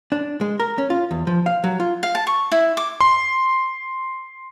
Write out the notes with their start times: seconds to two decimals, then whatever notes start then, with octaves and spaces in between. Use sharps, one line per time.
0.12 D4
0.41 G#3
0.60 A#4
0.78 C#4
0.90 F4
1.11 E2
1.27 F3
1.46 F5
1.64 F#3
1.80 F4
2.03 F5
2.15 A5
2.27 C#6
2.52 E4
2.77 D6
3.01 C6